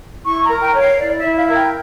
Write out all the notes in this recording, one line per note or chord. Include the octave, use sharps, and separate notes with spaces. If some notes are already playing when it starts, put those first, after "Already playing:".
E4 C#6
A#5
A#4
G5
C#5
F5
C#5
E4 D5
E5
E4
F5
A#4
G5